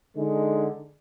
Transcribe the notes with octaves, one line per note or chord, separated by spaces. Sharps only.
D3 G#3 D#4